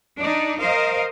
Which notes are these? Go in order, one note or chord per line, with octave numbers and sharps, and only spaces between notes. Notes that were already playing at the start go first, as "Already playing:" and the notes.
D4 D#4 D5
A#4 C5 D#5 F5